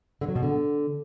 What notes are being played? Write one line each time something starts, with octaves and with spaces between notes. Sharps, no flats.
D3
F#3
B2
D3